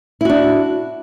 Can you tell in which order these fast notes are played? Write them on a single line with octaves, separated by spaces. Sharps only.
E4 F#4 D4